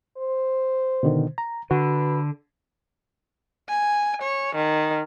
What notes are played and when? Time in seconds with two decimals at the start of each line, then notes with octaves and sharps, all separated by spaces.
0.17 C5
1.03 B2 D3 D#3
1.38 A#5
1.71 D3 F#4 B4
3.69 G#5
4.22 C#5
4.55 D#3